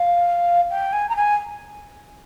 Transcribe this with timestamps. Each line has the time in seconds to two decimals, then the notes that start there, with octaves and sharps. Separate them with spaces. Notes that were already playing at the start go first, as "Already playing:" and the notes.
Already playing: F5
0.70 G5
0.92 G#5
1.09 A#5
1.16 G#5